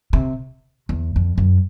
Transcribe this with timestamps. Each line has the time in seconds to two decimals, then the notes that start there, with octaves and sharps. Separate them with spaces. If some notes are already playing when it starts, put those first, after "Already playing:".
0.13 C3
0.89 E2
1.16 F2
1.38 F#2